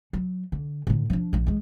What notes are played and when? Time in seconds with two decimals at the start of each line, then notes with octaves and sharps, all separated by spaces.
0.13 F#3
0.52 D3
0.87 A2 D3
1.10 F3 D4
1.33 A#1 F3
1.47 E3 G#3